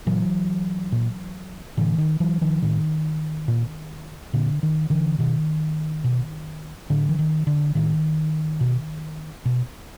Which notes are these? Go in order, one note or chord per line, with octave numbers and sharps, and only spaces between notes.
A#2 E3 F#3
A#2
A2 D3 E3
D#3
E3 F#3
D#3 F3
A2 D#3
A#2
A#2 D3
D#3
D3 E3
B2 D#3
B2
A2 D3
E3
D#3
D3
A2 D#3
B2
B2